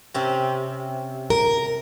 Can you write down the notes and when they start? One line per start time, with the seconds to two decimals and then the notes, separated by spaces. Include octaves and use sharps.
0.14 C3 C4 C#4
1.30 A#4